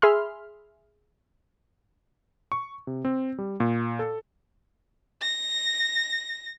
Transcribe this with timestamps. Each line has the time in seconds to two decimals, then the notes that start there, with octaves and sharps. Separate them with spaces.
0.02 G#4 E5 B5 C6 F6
2.52 C#6
2.87 C3
3.05 C4
3.38 G3
3.60 A#2
3.99 A4
5.22 A#6